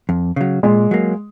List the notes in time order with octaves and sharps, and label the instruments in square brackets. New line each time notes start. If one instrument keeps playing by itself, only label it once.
[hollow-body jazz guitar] F2
C#3 F#3
[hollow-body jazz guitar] A#2 [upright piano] G#3
[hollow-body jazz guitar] F#3 A#3